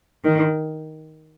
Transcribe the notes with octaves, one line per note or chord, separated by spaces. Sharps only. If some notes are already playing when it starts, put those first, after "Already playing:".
D#3